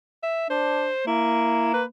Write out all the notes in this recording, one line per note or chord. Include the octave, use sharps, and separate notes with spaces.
E5
D4 C5
A#3 E4
B4